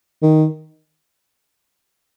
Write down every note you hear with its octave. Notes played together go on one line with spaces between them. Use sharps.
D#3